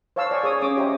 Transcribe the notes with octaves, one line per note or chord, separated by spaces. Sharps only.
C5 C#5 F5 A5 E6
D5 G#5 C#6
G#4 C#5 D#6
C#4 D6 D#6
G4 C5 C#5 D#5 E5 A#5